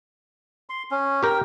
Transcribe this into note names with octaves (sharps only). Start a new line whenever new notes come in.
C6
C#4
G4 A#4 G5